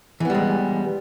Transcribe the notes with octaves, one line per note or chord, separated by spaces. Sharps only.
E3 G3 G#3 B3